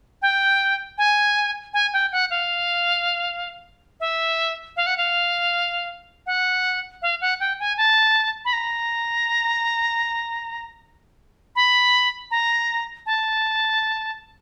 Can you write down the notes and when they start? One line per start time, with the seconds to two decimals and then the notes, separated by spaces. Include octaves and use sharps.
0.22 G5
0.98 G#5
1.74 G#5
1.93 G5
2.12 F#5
2.30 F5
4.00 E5
4.77 F5
4.86 F#5
4.97 F5
6.26 F#5
7.02 F5
7.21 F#5
7.40 G5
7.60 G#5
7.77 A5
8.45 B5
8.53 A#5
11.56 B5
12.31 A#5
13.06 A5